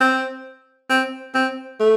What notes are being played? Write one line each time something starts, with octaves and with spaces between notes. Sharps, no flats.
C4
C4
C4
A3